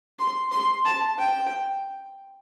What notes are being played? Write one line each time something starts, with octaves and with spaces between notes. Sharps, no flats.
C6
C6
A5
G5